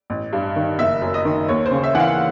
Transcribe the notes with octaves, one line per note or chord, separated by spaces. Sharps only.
A1
G2
D#3
F#1 E5
F#2
D#5
D#3
D#2 C#5
C5
C#3
E5
E3 F#5
F5